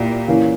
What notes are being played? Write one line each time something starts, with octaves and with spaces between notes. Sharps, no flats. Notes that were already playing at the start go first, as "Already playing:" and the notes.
Already playing: A#2 A#3 E4 G4
E3 A#3 C#4